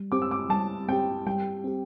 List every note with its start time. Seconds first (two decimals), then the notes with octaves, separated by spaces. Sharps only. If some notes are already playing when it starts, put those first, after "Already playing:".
Already playing: G3
0.12 C4 G4 D6
0.22 E6
0.31 D6
0.50 G3 A5
0.89 C4 G4 G5
1.26 G3 G5
1.64 C4 G4